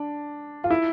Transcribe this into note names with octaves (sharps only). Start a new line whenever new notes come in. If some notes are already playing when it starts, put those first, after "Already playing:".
Already playing: D4
F4
E4